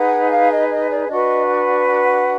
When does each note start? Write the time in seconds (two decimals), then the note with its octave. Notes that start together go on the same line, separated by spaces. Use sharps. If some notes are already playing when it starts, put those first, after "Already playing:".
Already playing: D#4 G#4 B4 F#5
0.32 F5
0.51 D#5
0.70 D#5
0.90 D5
1.08 D4 F#4 B4 D#5
1.47 F#5
1.85 F#5